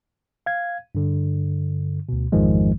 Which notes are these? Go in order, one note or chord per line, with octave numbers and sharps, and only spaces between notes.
F5 G#6
G2 D3
D2 B2
A1 F2 G#2 D#3 F3 G#3